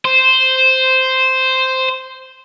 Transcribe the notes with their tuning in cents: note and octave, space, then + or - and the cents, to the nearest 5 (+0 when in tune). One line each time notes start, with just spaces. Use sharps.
C5 -5